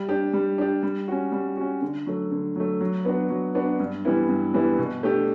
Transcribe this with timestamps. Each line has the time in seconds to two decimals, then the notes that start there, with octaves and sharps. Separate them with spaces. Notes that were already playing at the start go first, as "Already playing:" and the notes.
Already playing: G3
0.09 D4 G4
0.33 G3
0.58 D4 G4
0.83 G3
1.08 C#4 F#4
1.32 G3
1.57 C#4 F#4
1.82 D3
2.07 F#3 A3
2.31 D3
2.56 F#3 A3
2.81 F#3
3.05 B3 D4 F#4
3.30 F#3
3.55 B3 D4 F#4
3.80 G2
4.05 E3 G3 B3 E4
4.29 G2
4.54 E3 G3 B3 E4
4.78 B2
5.03 A3 D4 G4